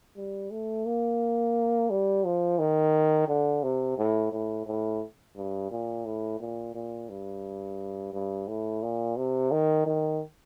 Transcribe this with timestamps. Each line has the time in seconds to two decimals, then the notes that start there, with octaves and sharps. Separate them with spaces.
0.16 G3
0.51 A3
0.85 A#3
1.90 G3
2.24 F3
2.59 D#3
3.28 D3
3.63 C3
3.98 A2
4.32 A2
4.66 A2
5.36 G2
5.71 A#2
6.05 A2
6.40 A#2
6.74 A#2
7.09 G2
8.13 G2
8.48 A2
8.82 A#2
9.17 C3
9.51 D#3
9.86 D#3